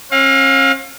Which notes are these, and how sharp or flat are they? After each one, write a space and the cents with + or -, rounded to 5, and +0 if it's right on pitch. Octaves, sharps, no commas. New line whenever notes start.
C#4 -40 F5 +30